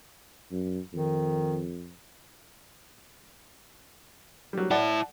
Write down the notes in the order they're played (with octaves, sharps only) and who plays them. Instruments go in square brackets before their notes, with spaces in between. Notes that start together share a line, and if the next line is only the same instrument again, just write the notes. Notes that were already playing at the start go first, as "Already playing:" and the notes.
[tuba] F#2
[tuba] F2 [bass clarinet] D#3
[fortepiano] F#3 G3
[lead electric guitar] E4 A5 [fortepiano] D5 F#5